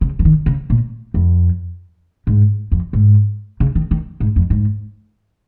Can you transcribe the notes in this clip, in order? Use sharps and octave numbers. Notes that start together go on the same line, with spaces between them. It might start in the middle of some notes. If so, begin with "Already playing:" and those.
C#3
F3
D#3
C#3
A#2
F2
G#2
F2
G#2
C#3
D#3
D#3
G#2
F2
G#2